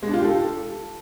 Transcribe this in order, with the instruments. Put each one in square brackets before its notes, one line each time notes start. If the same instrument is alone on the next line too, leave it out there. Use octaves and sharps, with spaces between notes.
[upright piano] G#3
D4
F4
G4
A4